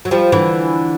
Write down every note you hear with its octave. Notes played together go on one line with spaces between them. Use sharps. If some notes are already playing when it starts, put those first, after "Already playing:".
F#3
F3 G3
D3 E3